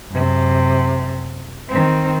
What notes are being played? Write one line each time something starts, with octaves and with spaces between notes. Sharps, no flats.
F#2 C3
D#3 C4